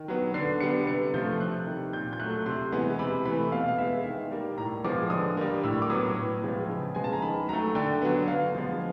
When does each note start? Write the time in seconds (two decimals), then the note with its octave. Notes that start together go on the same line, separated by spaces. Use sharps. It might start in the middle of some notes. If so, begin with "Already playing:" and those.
Already playing: D#3
0.08 F#3 B3
0.34 D3 C7
0.60 G3 B3 C#7
0.87 C3 C#7
1.14 F3 A3 G6
1.40 C3 F#6
1.67 D#3 G3
1.93 A#2 G6
2.13 G6
2.19 A3 F#6
2.23 F#3
2.46 C3 C6
2.72 E3 G#3 B3
2.99 C3 B5
3.25 E3 B5
3.30 A3
3.52 B2 F5
3.68 F5
3.78 G#3 B3 E5
4.05 D#3
4.31 G3 A#3
4.57 A2 A#5
4.84 F3 G#3 B3 D6
5.10 D3 D#6
5.37 G3 A#3
5.63 A2 E6
5.82 D6
5.90 F#3 B3 D#6
6.17 A2
6.43 F3 G#3 B3
6.69 C#3
6.95 F3 G#3 B3 G#5
7.04 A5
7.13 A#5
7.22 D#3 B5
7.49 F#3 A#5
7.53 A3
7.75 D3 G5
8.02 F#3 B3
8.28 D3 F5
8.55 F3 G#3 B3